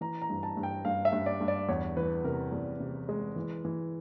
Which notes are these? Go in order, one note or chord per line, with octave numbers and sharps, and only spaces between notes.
E3 A#5
A#5
G2
A5
G2
G5
G2 F5
E5
G2
D5
G2
D5
E2 C#5
E3 B4
C3 A#4
E2
C3
G#3
E3
E3